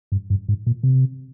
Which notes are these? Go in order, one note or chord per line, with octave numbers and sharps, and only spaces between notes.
G2
G2
G#2
A#2
C3